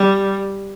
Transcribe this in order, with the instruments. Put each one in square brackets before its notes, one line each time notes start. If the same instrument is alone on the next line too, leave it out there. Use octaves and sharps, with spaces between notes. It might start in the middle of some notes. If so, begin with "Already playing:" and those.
Already playing: [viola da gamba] G3